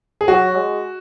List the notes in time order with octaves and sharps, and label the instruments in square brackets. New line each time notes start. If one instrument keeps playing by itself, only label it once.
[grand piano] G#4
[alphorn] F#3 [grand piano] F#4
[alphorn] G#3